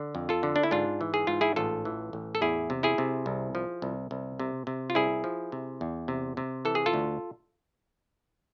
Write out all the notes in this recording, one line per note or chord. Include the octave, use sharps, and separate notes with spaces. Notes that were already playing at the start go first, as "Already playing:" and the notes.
Already playing: D3
F2
F4 A4
D3
D4
E4
G#2 D4 F4
E3
G#4
G#2 F4
E4 G#4
A1 F4 A4
E3
A1
A4
E2 E4 G#4
C3
E4 G#4
C3
C2
F3
C2
C2
C3
C3
F4
C2 E4 G#4
F3
C3
E2
C3
C3
E3 A4
G#4
F4 A4
D2